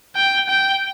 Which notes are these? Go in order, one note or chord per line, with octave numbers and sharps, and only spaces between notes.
G5
G5